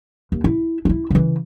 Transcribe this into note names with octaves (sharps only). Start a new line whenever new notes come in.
D#2
E4
D4 E4
C#3 E3